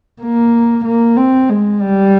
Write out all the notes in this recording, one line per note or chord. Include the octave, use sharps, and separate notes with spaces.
A#3
A#3
C4
G#3
G3